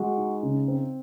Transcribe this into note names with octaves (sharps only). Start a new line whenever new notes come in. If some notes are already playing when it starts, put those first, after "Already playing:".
Already playing: G#3 F#4
D#4
C#3
C4